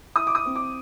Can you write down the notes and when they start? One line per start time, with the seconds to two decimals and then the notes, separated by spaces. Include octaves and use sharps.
0.15 E4 D#6
0.27 D6
0.35 D#6
0.46 C4
0.56 D6